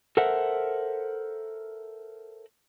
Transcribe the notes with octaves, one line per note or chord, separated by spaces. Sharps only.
A4 A#4 C5 E5 F#5